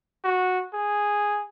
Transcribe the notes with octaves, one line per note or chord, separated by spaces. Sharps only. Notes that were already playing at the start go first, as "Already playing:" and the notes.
F#4
G#4